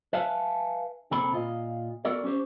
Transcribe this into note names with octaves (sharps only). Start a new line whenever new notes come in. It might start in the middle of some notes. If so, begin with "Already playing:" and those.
B4 E5 F5 G#5 A5
C3 A#3 C4 A4 B5
A#2 F4 D#5
B3 F#4 A4 A#4 D5
C#4 G4 C5